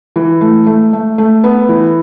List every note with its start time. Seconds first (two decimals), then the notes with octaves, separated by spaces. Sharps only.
0.16 E3
0.41 A3
0.67 A3
0.93 A3
1.18 A3
1.44 B3
1.69 E3